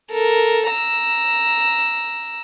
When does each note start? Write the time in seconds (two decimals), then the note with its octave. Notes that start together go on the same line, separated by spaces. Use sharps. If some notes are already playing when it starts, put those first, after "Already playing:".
0.11 A4 A#4
0.70 A#5 E6